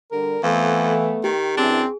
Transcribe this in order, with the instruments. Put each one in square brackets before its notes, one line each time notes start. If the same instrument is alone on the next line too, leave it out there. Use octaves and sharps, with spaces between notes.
[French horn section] D3 G3 [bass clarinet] A#4
[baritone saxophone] F2 [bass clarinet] E3 [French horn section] A3 B3 [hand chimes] F5
[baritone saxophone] D#3 [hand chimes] G4
[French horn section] F#2 E3 [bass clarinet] C4 [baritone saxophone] D4 [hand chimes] G#4